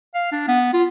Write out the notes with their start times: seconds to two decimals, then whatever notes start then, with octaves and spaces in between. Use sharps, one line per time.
0.14 F5
0.32 D4
0.48 B3
0.73 F4